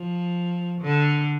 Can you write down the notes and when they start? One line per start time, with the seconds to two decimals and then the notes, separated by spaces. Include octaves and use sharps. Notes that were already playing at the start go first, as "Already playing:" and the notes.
Already playing: F3
0.81 D3